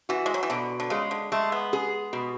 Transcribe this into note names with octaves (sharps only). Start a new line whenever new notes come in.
E3 F#4
G#3
F#3
E3
B2 D3
D3
C#3 G#3
D3
G#3 A3
B3
G#4
B2